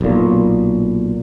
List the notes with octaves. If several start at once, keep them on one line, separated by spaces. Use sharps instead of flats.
B1 A#2